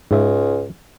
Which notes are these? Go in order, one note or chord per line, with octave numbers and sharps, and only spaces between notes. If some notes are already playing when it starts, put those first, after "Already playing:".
C#2 G#2 E5